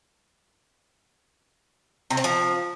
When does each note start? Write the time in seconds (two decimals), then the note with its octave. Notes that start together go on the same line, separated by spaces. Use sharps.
2.10 C3
2.17 C4
2.24 F3